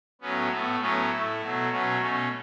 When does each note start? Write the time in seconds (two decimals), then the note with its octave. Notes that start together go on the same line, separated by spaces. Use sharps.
0.21 A2 F#3 B3 C#4
0.51 A2 A3 B3
0.81 A2 F#3 B3 C#4
1.11 A2 A3 E4
1.41 B2 F#3 A3
1.72 B2 F#3 A3 C#4
2.01 B2 A3 C#4